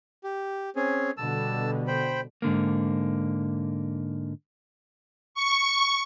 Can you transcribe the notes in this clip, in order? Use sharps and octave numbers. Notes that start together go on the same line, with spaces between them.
G4
C4 C#4 G#4
B2 D3 G3 A5 E6
C5 G5 B5
G#2 D3 A#3
C#6